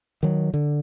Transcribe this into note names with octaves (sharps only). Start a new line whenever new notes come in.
D#3 F#3
D3